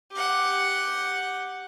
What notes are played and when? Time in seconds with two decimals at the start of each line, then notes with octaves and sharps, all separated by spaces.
0.12 G4 F#5